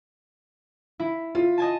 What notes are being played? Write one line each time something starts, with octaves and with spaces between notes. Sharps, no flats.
E4
F4
D#5 G#5 A5